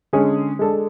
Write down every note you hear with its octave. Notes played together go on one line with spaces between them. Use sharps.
D3 G#3 C#4 G#4
G#3 D4 A4